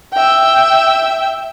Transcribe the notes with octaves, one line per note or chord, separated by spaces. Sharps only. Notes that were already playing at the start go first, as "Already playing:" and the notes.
E5 G5